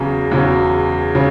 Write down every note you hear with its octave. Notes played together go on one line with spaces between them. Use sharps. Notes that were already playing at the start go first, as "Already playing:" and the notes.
Already playing: E2 C#3 F#3
E2 C#3 F#3
C#3